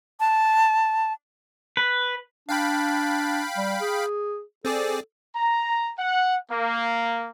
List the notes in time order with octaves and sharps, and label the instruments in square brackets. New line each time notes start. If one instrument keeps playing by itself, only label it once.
[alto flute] A5
[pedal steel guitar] B4
[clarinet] D4 [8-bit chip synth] F5 G5 B5
[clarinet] G3
G#4
[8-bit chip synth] C4 G#4 D5 [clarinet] A4
[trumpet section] A#5
F#5
A#3